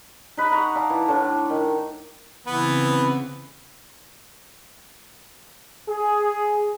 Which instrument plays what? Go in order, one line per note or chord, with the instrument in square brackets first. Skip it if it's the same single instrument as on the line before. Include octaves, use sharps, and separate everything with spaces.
[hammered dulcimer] D#4 B4
F#5 A#5 C#6
A4 D5 F5
E3
A2 A3 D4
D#3
[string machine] C#3 C4 [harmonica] E3 B3
[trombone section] G#4